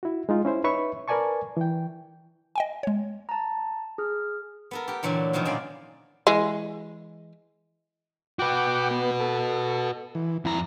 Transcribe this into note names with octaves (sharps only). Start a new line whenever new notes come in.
E4 F#4
G#3 D#4 F4
C#4 E4 C5 E5
D#4 B4 C#5 E5 B5 C#6
A#4 B4 D5 G#5 A5 C#6
E3 G5
D#5 G5 G#5
G#3 C#5
A5 A#5
G#4 F6
B3 A4 A#4
G4 A#4
A#2 D3 E3 F#3 A3
B2 D#3 F3 F#3 A#3
A#2 G#3 C#4 D5 F5
E3 G#3
F#4 B4 F#5 G5 D6
B3
A4
E3
F2 E4 A#5